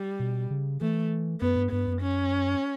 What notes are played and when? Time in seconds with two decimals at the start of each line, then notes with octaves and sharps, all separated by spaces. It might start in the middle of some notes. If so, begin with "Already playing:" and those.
Already playing: G3
0.20 B2
0.50 C#3
0.81 E3 A3
1.41 F#2 B3
1.56 G2
1.71 G2 B3
1.87 F#2
2.02 C#4